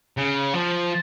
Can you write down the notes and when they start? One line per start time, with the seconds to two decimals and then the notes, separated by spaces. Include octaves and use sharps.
0.17 C#3
0.54 F3